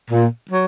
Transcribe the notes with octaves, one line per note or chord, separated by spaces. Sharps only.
A#2
F#3